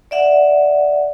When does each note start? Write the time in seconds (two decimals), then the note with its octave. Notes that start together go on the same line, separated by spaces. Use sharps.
0.11 D5 E5 F#5